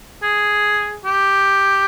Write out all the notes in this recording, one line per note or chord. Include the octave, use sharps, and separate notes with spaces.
G#4
G4